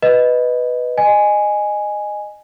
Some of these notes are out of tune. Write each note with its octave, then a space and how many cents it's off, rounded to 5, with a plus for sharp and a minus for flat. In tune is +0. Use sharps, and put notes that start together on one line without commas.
B4 +0 D#5 +0
D#5 -20 G#5 +0